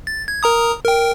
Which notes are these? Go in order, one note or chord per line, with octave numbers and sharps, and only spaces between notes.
A6
G#6
A#4 A#5 D#6
A#4 G5